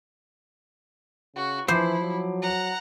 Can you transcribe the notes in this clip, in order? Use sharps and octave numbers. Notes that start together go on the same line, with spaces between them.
C#3 F#4
E3 F3 E4 C5 D6 C7
F#3
F#5 A#5